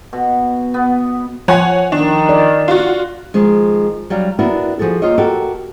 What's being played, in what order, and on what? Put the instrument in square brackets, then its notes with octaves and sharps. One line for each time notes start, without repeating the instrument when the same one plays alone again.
[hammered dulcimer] B2
B3
[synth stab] F3 [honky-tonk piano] C#5 F#5 G#5
[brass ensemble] D#3 [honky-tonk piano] D4
[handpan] D5
[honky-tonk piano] F4 F#4
[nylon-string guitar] D#3 F3 G#3
F#3 G3 D4 F5
B3 D4 E4 F#4 A#4
F3 F#4 G#4 A4
A#3 F4 C#5 D#5
F#4 G4 A4 A#4